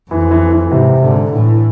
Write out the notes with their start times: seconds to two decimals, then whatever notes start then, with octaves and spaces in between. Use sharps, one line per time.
0.11 F2 E3
0.31 E3
0.51 E3
0.71 G#2 C3
1.02 G#2 D3
1.33 A2 E3